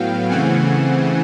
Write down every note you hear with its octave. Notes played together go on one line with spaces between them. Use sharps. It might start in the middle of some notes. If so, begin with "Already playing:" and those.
Already playing: A2 F#3 B3 F5 G5
C#3 E3 A3 C4 F#5 G#5